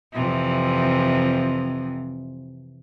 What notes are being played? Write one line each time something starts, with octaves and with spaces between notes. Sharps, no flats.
F2 C3 E3